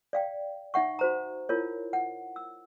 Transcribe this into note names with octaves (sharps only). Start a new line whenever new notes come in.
D5 F5 G5
D#4 E5 F#5 C#6
F#4 C5 A#5
E4 F4 A#4 C#5
F#5
E6